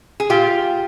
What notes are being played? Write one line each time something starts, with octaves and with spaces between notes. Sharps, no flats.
G#4
A#2 F4 G4